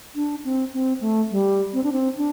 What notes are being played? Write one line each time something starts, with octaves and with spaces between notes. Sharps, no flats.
D4
C4
C4
A3
G3
C4
D4
C4
D4